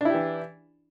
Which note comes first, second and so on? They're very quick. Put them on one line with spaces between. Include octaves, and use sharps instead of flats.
D4 E4 G4 E3